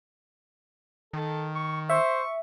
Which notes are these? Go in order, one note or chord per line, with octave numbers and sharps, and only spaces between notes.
D#3 A4
C#6
C5 E5 C#6